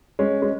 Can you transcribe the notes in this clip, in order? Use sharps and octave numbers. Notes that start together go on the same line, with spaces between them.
G#3 C#4
G#3